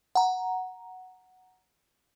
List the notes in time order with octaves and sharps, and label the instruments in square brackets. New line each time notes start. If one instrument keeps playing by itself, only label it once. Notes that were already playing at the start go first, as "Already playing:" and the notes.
[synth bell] F#5 A#5